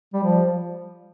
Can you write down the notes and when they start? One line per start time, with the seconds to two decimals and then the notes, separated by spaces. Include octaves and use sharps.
0.13 G3
0.23 F3